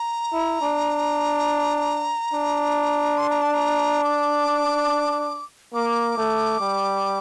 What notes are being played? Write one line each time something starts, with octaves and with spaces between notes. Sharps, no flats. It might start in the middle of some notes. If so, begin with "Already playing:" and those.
Already playing: A#5
E4
D4
D4
C6
A#5
A5
A#5
D6
A#3 D6
A3
G3